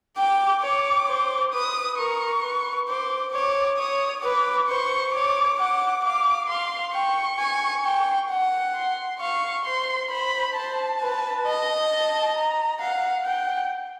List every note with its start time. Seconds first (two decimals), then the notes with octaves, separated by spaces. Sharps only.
0.17 G5 D6
0.62 C#5 D6
1.08 C5
1.53 B4 D#6
1.98 A#4 C#6
2.43 B4
2.88 C5 D6
3.33 C#5 D6
3.78 C#5 D#6
4.24 B4 D6
4.69 C5 C#6
5.14 C#5 D6
5.59 F#5 D6
6.04 F5 D6
6.49 F5 C6
6.94 G5 C#6
7.39 G#5
7.85 G5
8.31 F#5
8.75 C6
9.20 F5 C#6
9.65 C5 C6
10.10 C5 B5
10.56 C5 A5
11.01 B4
11.47 D#5
11.91 A5
12.37 A#5
12.81 F5 F#5
13.26 F#5 G5